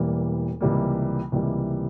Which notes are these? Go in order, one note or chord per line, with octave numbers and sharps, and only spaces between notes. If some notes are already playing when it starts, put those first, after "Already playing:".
Already playing: E1 E2 E3 G3 A#3
C#2 C3 E3 G3 A#3
C#2 C3 E3 G3 A#3